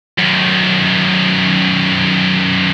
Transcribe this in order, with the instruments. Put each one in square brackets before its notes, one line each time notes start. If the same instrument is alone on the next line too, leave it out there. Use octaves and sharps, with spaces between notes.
[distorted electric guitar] F#2 D#3